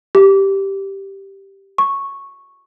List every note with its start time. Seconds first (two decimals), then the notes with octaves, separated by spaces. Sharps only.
0.15 G4
1.78 C#6